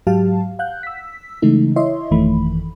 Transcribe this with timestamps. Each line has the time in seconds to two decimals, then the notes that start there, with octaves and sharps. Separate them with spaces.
0.07 G#2 F#3 G4 F5 A5
0.59 F5 F#5 F#6 G6
0.83 E6 B6
1.42 C#3 E3 G#3 A3 D#4
1.76 E4 C#5 D#5 E5 C6
2.11 G1 F2 D#3 E3 A3 B5